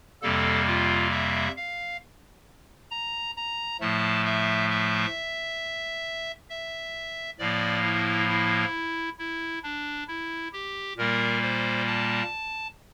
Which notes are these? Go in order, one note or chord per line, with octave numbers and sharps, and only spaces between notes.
F2 C3 G3 A#3 A4
F4
E5
F5
A#5
A#5
A2 F3 A3 A5
E5
E5
E5
A2 F3 A#3 D5
E4
E4
E4
D4
E4
G4
A#2 G3 A#3 A#4
C5
A5